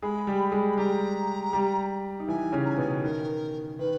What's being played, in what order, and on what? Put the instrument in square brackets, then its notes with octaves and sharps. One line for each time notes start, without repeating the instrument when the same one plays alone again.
[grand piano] G#3 G#4 [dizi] B5
[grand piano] G3 G4
G#3 G#4
[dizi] B5
[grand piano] G3 G4 [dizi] A#5
[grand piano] G3 G4
D#4
[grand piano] E3 E4 [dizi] G#5
[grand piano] C#3 C#4
[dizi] A#5
G#5
[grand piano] B2 B3
[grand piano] D#3 [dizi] A#4
[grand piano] D#3 [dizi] B4